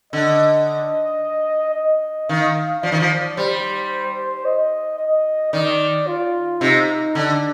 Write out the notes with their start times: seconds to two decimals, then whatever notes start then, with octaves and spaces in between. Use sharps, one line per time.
0.13 D3 D#5
1.74 D#5
2.29 D#3 F5
2.83 F3 D5
2.92 D#3
3.00 F3
3.37 G3 C5
4.45 D#5
4.99 D#5
5.53 D#3 D5
6.07 F4
6.61 C3 D#4
7.15 D3 D4